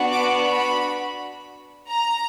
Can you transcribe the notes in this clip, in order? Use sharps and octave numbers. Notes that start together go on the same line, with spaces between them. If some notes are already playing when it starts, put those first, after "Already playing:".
Already playing: B3 D4 F#4
D6
B5
A#5